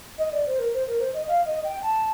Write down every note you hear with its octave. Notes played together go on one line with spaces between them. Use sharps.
D#5
D5
C5
A#4
C5
A#4
C5
D#5
F5
D#5
G5
A5